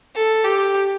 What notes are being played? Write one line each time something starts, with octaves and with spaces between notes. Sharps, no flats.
A4
G4